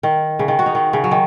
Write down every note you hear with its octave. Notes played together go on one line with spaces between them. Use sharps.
D#3
C#3
D#3
F#4
D#4
D#3
C#3
F#3
D#3